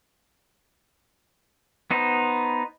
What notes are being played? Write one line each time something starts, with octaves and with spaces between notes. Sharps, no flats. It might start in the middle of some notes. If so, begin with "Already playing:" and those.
B3 D#4 C5